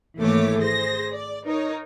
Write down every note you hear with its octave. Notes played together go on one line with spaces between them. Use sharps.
G#1 E3 A3 A#3 C#5 D6
G#4 C5 A#6
D5
D#4 A#4 C#5